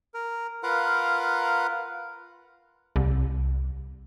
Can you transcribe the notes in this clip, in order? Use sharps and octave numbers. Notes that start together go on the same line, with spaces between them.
A#4
F4 A#4 B4 F5 F#5
C2